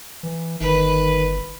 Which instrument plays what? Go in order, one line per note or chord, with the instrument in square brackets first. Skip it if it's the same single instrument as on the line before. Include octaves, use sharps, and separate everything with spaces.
[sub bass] E3
[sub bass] G1 [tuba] D#3 [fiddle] B4